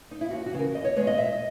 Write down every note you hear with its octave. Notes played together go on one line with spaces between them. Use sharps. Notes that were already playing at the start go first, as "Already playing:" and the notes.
D#4
E4
D#2 F#4
F#4
C#3 E3
A#4
D#2 D#5
C#5
D#3 G#3 B3 C#5
D#5
A#2 E5
D#5